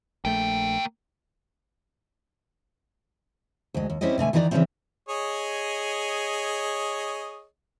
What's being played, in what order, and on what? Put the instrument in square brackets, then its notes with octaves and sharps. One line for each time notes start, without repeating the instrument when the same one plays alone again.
[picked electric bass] A#1 A3 [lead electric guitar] A#3 G5
[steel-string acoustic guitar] D2 G#3
D#2
G3 C4 C#4 E4 G4 D#5
B2 D3 A3 G#5
D#3 E3 D#4 A#4 D5 A#5
C#3 E3 F3 G3 A3 C4
[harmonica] G#4 C#5 D#5